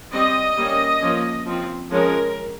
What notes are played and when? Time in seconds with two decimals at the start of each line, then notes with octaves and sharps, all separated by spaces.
0.12 G3 C4 D#5
0.57 G3 A#3 C#4
1.01 F3 A#3 C#4
1.46 F3 C4
1.91 F3 G#3 C#4 A#4